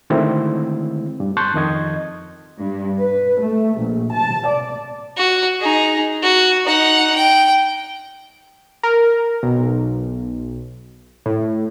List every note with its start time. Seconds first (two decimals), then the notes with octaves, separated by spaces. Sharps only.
0.10 D3 D#3 G#3 A3 C4 E4
1.20 G2
1.37 A5 C6 C#6 F#6 G6 A6
1.54 F2 D#3 D#5 G#6
2.61 G2
2.97 B4
3.40 A3
3.80 A#1
4.12 A5
4.49 D5
5.17 F#4
5.60 D#4 G#4
6.23 F#4
6.66 D#4 F#5
7.16 G5
8.83 A#4
9.43 B1
11.26 A2